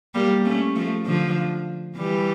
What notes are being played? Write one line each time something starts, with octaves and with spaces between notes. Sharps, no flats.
G3 A#3
A3 C#4
F3 A3
D3 F3
E3 G3